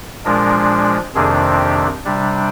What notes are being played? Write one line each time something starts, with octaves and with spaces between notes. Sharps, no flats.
A#2 F3 G#3 D4 A#4
F2 C3 D#3 A#3 D4 G#4
G4
C3 G3 D4